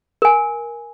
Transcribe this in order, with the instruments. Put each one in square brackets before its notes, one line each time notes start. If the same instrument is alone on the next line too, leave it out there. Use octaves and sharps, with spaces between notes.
[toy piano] A#4 G#5